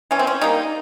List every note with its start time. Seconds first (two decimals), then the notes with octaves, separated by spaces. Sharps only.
0.11 E3 C#4
0.19 C4
0.27 C#4
0.41 G3 A#3 D#4